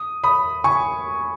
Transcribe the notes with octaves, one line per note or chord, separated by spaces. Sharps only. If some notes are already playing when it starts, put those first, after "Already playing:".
Already playing: D#6
B5 D#6
G#5 C#6